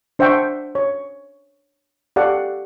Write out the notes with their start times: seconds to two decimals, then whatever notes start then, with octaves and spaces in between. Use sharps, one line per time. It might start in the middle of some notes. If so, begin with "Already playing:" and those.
0.19 D4 C5 E5 F#5 G5 C#6
0.75 C#5
2.16 G4 A4 D5 F5 F#5